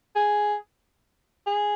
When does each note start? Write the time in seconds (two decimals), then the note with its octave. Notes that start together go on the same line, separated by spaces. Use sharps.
0.16 G#4
1.47 G#4